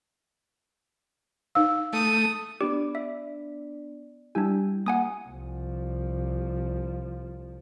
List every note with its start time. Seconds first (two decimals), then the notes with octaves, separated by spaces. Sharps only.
1.55 D#4 F5 E6
1.93 A3 D#6
2.61 B3 D4 G4 D5
2.95 E5
4.35 G3 D4 E4 G4 G#5
4.86 A#3 F#5 G#5 D#6
5.28 C2 F3